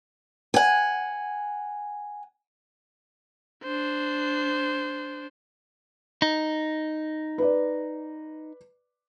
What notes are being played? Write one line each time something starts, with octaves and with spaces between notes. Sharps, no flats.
F#5 G#5
D4 C5
D#4
B4 D5